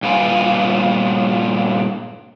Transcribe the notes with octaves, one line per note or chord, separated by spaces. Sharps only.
G2 A#2 F4 B4 F5 G#5